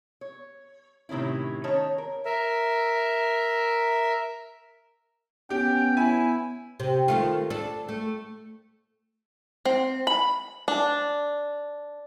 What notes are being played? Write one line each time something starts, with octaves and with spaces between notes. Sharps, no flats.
C#5
A2 C3 D#3 C#4 E4
D#3 C#4 C#5 D#5 A5
A#4
A#4 E5
B3 C#4 G4 G5
E4 G#5
C3
D#3 A3 F4
D4 A4
A3
C4
B5
D4